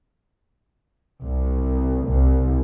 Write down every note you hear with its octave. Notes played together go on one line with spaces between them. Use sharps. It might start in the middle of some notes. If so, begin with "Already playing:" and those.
C2
C2